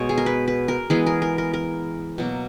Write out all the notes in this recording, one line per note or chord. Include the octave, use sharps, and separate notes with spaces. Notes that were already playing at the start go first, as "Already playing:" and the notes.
Already playing: B2 G#3 B3 C#5
G#4
A#4
B4
B4
A#4
E3 G#3 B3 G#4
A#4
A#4
A#4
A#4
B2 F#3 A#3